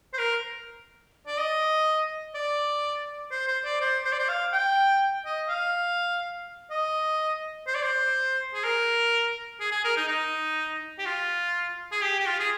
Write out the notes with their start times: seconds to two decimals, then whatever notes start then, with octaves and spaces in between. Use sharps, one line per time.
0.13 C5
0.18 A#4
1.27 D5
1.38 D#5
2.35 D5
3.31 C5
3.48 C5
3.64 D5
3.81 C5
4.04 C5
4.12 D5
4.19 C5
4.29 F5
4.53 G5
5.25 D#5
5.49 F5
6.70 D#5
7.67 C5
7.74 D5
7.83 C5
8.54 G#4
8.64 A#4
9.60 G#4
9.72 G#4
9.84 A#4
9.96 D#4
10.09 D#4
10.99 G4
11.05 F4
11.92 G#4
12.02 G4
12.20 G4
12.27 F4
12.39 G#4